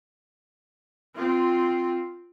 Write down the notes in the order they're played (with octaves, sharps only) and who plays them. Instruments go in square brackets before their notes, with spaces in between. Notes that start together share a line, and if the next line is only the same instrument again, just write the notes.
[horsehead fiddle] C4 F4